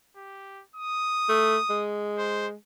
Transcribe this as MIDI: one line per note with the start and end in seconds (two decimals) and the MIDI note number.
0.15 0.63 67
0.75 1.88 87
1.29 1.57 57
1.70 2.54 56
2.18 2.47 72